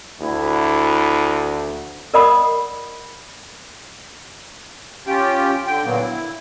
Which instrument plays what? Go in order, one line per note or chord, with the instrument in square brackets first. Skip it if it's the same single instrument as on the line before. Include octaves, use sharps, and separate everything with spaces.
[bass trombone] D2 [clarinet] E4
[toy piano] A#4 D5 D#5 F#5 B5 D#6
[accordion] C#4 F4 G4 G5
D3 G5
A#2 D3 F#3 A#3 B3
E4